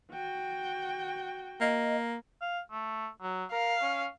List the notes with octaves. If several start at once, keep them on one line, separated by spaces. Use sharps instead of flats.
F#4 G5
A#3 D#5
F5
A3
F#3
A#4 F5
C#4